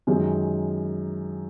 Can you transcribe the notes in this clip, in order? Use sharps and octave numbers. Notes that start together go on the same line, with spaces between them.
F#2 D#3 G#3